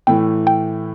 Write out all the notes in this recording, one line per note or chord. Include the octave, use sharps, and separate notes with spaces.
A2 E3 A3 G5
G5